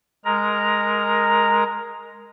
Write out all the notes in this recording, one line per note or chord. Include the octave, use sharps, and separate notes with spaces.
G#3 A#4 A#5